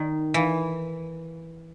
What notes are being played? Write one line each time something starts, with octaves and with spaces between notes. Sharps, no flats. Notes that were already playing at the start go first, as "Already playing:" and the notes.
Already playing: D#3
E3